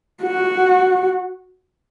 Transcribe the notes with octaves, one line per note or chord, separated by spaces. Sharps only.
F#4